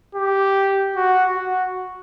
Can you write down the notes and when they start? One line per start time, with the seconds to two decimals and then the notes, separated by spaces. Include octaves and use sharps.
0.15 G4
0.96 F#4
1.38 F#4